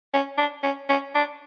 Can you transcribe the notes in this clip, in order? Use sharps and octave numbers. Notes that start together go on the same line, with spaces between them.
C#4
D4
C#4
C#4
D4